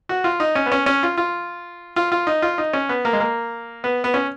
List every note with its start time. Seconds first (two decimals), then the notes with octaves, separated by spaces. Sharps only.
0.09 F#4
0.24 F4
0.40 D#4
0.55 C#4
0.66 B3
0.72 C#4
0.86 C#4
1.03 F4
1.17 F4
1.96 F4
2.12 F4
2.27 D#4
2.42 F4
2.58 D#4
2.73 C#4
2.89 B3
3.05 A#3
3.13 G#3
3.20 A#3
3.84 B3
4.04 B3
4.14 C#4